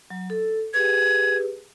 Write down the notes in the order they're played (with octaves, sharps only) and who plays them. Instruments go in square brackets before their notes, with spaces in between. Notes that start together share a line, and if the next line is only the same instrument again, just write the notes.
[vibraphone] F#3
A4
[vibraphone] G4 G#4 B4 [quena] G#6